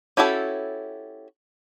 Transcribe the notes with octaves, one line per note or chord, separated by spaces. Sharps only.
C#4 E4 F#4 G4 A4